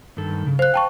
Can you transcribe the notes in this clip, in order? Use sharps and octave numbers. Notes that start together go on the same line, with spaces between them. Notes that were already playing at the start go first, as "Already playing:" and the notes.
G2 D#3 A4
C#3
C5 F5 F#6
G5 A5 C#6